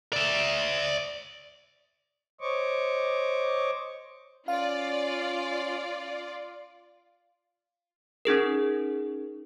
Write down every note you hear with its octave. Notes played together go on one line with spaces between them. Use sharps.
D5 E5
C5 C#5 D#5 C#6 D6
C#4 F4 D5 F5
C#4 D#4 G#4 A#4